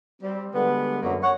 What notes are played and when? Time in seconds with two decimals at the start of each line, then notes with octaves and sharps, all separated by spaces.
0.22 G3 C4
0.53 D3 G3 G#3 B3
1.02 F#2 D3 A#3
1.22 C#5 F#5